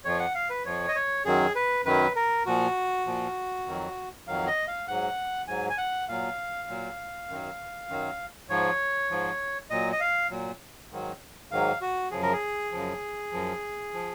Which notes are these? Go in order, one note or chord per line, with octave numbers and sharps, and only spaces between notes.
F2 F3 C#5
F#5
F5
B4
F2 F3 C#5
D#5
C#5
F#2 D#3 F#3 G#4
B4
F#2 D#3 F#3 B4
A#4
A#2 F3 F#4
A#2 F3
F2 D#3 F#3
F2 D#3 F#3 F5
D#5
F5
G#2 F#3 F#5
G#2 F#3 G#5
G#5
F#5
A#2 F#3 F5
A#2 F#3
F#2 D#3 F#3
F#2 D#3 F#3
G#2 F3 C#5
G#2 F3
A#2 F#3 D#5
D#5
F5
A#2 F#3
G#2 D#3 F#3
G#2 D#3 F#3 F5
F#4
F#2 C#3 F3 G#4
A#4
G#4
F#2 C#3 F3
F#2 F3
F3